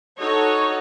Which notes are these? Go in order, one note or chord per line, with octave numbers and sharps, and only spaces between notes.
D#4 F#4 A4 C#5